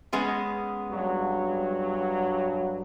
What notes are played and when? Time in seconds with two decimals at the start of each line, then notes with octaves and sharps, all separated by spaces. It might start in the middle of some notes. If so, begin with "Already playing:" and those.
0.13 G#3 B3 C#4
0.90 G2 F#3